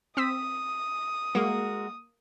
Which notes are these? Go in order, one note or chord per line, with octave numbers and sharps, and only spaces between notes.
C4 D#6 E6 B6
G#3 A#3 F#4 A#4